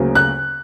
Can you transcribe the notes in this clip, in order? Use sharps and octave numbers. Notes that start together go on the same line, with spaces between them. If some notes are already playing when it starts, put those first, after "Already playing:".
Already playing: D2 C#3 F#3 A#3
F#6